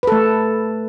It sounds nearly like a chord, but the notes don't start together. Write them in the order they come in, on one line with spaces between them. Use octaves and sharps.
B4 A4 A3